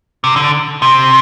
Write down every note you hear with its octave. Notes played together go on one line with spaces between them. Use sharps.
C3
D3
C3